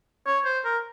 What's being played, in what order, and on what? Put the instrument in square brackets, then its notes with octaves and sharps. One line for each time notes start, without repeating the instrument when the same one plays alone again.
[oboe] C#5
C5
A#4